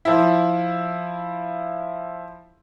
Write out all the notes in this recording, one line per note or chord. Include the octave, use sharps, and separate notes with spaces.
F3 E4